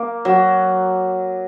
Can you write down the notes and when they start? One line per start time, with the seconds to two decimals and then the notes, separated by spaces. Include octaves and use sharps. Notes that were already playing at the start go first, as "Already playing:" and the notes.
Already playing: A#3
0.25 F#3